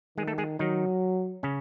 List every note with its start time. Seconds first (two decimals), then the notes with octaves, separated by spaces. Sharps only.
0.18 D#3 G#3 G#4
0.28 A3 A4
0.38 G#3 G#4
0.59 D#3 F#3 D#4
1.43 C#3 C#4